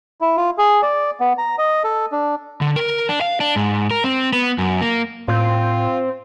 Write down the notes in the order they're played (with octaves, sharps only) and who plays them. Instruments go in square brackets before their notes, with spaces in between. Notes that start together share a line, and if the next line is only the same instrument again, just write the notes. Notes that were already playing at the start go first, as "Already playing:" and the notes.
[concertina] E4
F4
G#4
D5
B3
A#5
D#5
A4
D4
[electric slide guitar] D3
A#4
D4
F5
D4
G#2
A#4
C4
B3
F#2
A#3
[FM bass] A2 [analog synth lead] C4 [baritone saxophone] F4